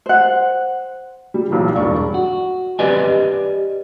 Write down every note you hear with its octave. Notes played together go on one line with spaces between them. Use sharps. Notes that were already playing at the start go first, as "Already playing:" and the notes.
C5 F#5
G3
B1 A#2 E3 G3
E1 G2 D5 C#6
F#4
G4 B4 D5 D#5 G#5